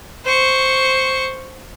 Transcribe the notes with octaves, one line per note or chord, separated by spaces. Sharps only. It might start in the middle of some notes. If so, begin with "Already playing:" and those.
C5 C#6